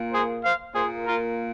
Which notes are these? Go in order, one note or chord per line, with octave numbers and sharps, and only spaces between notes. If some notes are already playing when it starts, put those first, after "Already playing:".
Already playing: A#2 A#3
G#4 C5
C5 F5
A#2 A#3 G#4 C5
F4 A#4